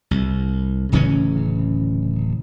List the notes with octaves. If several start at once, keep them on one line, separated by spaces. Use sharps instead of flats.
C2
D1 C#3 E3 C#4